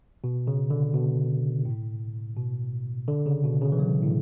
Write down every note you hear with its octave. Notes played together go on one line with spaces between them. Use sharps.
B2
C#3
D3
B2
A2
B2
D3
C#3
B2
C#3
E3
F#3
A2